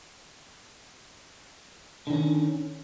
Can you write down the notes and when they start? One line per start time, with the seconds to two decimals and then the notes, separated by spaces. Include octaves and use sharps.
2.07 D3
2.10 D#3
2.13 C#4